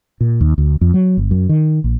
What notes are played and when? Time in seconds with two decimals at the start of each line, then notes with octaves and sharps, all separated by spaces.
0.21 A#2
0.41 D#2
0.58 D2
0.81 F2
0.94 F#3
1.17 G1
1.31 F#2
1.49 D#3
1.84 A#1